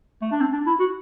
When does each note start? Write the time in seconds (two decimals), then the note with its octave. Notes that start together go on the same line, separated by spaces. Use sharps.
0.22 A3
0.32 D4
0.41 C4
0.53 D4
0.67 E4
0.80 F#4